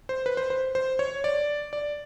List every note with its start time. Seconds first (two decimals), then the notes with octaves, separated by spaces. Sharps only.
0.09 C5
0.26 B4
0.37 C5
0.50 C5
0.75 C5
0.99 C#5
1.24 D5
1.73 D5